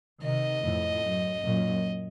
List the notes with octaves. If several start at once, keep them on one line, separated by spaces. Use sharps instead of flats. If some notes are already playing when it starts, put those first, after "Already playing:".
C3 D#3 D#5
F2 A2
F#2
F#2 A#2